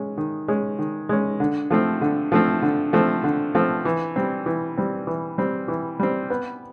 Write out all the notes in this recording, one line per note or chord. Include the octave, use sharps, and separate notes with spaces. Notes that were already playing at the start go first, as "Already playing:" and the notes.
Already playing: G#3 C#4
D#3
G#3 C#4
D#3
G#3 C#4
D3
F3 A3 C4
D3
F3 A3 C4
D3
F3 A3 C4
D3
F3 A3 C4
E3
G3 C4
E3
G3 C4
E3
G3 C4
E3
G3 C4
B3